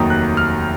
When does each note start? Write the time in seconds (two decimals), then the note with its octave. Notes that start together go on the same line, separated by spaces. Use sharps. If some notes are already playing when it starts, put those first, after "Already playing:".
Already playing: F1 D#2 D#3 F#3 D#6
0.10 F#6
0.37 F6